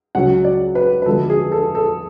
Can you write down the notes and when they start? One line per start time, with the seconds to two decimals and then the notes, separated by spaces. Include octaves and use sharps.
0.15 C#2 C#3 F#3 C#4 F#5
0.44 D5
0.75 B4
1.02 B4
1.06 D2 D3 F3 G#3 B3 A4
1.30 G#4
1.52 A4
1.75 A4